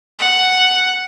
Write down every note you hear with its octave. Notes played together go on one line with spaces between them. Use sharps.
F#5